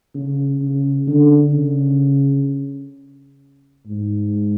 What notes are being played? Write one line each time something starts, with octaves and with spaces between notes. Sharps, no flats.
C#3
C#3
D3
C#3
G#2